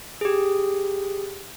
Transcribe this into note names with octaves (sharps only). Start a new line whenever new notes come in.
G4 G#4